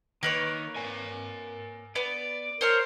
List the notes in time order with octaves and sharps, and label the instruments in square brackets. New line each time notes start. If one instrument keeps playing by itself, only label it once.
[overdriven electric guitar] D#3 D#4 [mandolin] A#3 B4 C#5
[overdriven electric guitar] A#4 G#5
[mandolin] B3 [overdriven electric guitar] D5
[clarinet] A#4 [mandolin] C5 C#5 C6